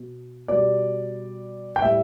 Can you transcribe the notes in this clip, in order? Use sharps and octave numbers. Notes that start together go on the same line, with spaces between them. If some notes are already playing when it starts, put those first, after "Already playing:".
Already playing: B2
B2 G3 D5
G5
A2 G3 E5